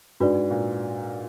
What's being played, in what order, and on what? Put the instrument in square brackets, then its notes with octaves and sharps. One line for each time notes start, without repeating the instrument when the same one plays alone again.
[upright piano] G#2 [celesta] D4 F#4 B4 D5
[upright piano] A#2